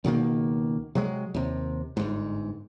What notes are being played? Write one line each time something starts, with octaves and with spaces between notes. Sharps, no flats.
C#2 B2 D#3 A#3
C3 F#3 G#3
D#2 C3
G1 G#2